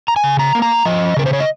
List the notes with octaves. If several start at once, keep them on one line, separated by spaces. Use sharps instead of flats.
A#5
G#5
C#3
A#5
A#3
A#5
F3 D#5
C#3 A#4
C5
C#5
D#5